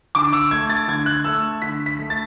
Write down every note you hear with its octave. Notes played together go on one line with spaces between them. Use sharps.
D3 D6
E6
A3 G#6
A6
D3 G#6
F#6
A3 E6
D3 B6
B6
A3
A6